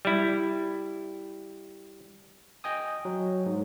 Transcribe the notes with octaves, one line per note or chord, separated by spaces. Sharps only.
G3 E4
D#5 G5 G#5 D#6
F#3
G#2